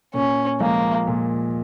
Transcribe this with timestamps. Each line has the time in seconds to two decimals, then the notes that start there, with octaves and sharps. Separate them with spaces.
0.14 A#2 C#4
0.60 F3 G#3 A#3 F4
1.07 A#2